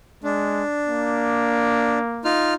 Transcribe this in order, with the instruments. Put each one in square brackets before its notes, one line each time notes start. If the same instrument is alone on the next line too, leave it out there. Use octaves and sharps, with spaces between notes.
[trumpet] G#3 [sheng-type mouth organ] D4
[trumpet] A#3
[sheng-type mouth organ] D#4 F4 F6